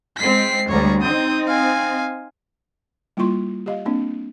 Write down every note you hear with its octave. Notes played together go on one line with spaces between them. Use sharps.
G#3 C4 B6 C7
D2 G3 C#5 A#5
C4 D#4 D#6 G6
F5 G#5
G3 A#3 E4 F4 C6 C#6
G4 D#5 F5
A#3 C4 D4